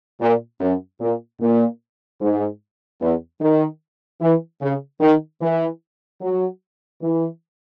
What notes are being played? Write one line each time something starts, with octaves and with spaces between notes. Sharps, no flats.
A#2
F#2
A#2
A#2
G#2
E2
D#3
E3
C#3
D#3
E3
F#3
E3